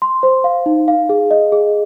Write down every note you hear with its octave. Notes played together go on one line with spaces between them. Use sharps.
C6
C5
F5
D#4
F5
G#4
D#5
G#4